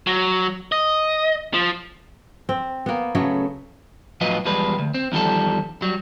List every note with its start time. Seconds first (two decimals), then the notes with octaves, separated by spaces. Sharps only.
0.07 F#3
0.72 D#5
1.54 F3
2.49 C4
2.86 A#3 B3
3.15 C#3 F#3 A3 B3
4.21 A2 F3 F#3 F4 B4 D#5
4.45 E2 F3 G3 G#3 B4
4.79 D2
4.94 C4
5.12 E2 D#3 F3 G3 A4
5.82 F#3 G3